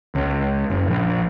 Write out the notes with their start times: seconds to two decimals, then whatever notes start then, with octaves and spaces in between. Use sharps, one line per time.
0.15 C#2
0.70 F#1
0.87 A#1